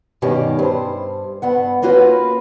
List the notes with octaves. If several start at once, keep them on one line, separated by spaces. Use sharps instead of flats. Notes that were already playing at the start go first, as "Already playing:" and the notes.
G2 B2 D#3 C#4 G4
G2 C5
G2 B3 F#5
A#3 C#4 F4 F#4 A#4 B4